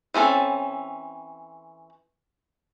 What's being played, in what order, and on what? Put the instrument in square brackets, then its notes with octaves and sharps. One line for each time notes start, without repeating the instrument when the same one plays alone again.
[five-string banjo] E3 C4 C#4 A4